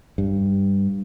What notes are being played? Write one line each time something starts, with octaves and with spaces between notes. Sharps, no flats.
G2